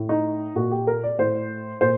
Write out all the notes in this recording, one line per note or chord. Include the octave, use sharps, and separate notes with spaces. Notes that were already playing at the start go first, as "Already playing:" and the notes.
Already playing: A2
D#4
A#2 F#4
G4
A#4
D5
A2 C5
A#2 C5